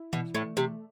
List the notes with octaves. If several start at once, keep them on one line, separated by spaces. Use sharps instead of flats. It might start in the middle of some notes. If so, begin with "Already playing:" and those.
Already playing: E4
B2 E3
A2 A3
C3 E3